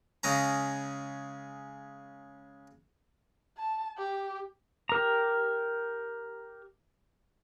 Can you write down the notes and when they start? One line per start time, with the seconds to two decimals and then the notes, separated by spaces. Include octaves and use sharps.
0.23 C#3 G#3 C#4 A#5
3.58 A5
3.98 G4
4.89 G4 A#4 A#5